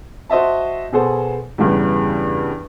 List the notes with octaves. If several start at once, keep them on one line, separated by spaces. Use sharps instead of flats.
F#4 C5 D#5 E5 A5
B2 B3 G#4 A4 C5
E2 G2 C#3